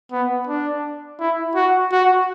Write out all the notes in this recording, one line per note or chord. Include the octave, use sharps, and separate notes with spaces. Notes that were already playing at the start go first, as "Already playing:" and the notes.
B3
D4
E4
F#4
F#4